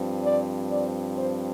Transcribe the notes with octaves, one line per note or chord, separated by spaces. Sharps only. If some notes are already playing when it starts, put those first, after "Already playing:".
Already playing: G2 F3 C4
D5
D5
C5